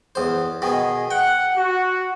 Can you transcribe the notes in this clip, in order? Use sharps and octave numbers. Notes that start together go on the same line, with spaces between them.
E2 C5
B2 D#3 G#4
F#5 G5
F#4